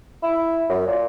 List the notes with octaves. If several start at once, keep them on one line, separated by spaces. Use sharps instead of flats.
E4
F#2
A#2